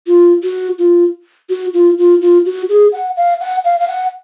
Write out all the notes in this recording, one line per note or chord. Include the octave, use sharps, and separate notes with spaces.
F4
F#4
F4
F#4
F4
F4
F4
F#4
G#4
F#5
F5
F#5
F5
F5
F#5